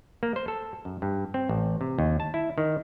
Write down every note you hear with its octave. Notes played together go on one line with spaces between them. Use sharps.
A#3
C5
A4
F#2
G2
C4
A1
C3
D#2
A5
E4
D#3